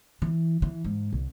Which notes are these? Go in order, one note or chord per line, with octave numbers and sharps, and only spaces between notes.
E3
E3
G#2
C2